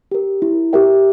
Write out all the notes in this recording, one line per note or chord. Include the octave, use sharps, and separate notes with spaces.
G4 A#4
E4
G4 A#4 E5 G5